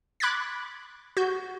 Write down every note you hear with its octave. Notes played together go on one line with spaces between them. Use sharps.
B5 D6 F#6 G#6 A6 B6
F#4 G6